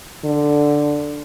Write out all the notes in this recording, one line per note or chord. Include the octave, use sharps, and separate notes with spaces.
D3